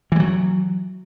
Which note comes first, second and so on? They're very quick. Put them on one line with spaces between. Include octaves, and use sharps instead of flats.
E3 G3 F#3